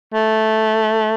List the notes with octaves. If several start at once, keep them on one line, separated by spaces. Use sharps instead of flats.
A3